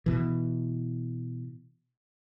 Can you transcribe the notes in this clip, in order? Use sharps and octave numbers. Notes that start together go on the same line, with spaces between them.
B2 E3